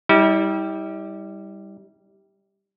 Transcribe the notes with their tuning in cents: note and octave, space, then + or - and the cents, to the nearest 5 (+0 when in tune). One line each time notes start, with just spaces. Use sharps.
G3 +0 E4 -40